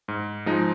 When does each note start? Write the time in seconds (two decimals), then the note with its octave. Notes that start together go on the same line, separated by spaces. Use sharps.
0.08 G#2
0.46 F3 G#3 D#4